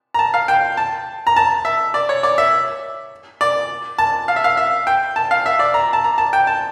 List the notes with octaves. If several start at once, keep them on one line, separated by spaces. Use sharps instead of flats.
A#5
A5
F5
G5
A5
A#5
A5
E5
D5
C#5
D5
E5
D5
A5
F5
E5
F5
E5
G5
A5
F5
E5
D5
A#5
A5
A#5
A5
G5
A5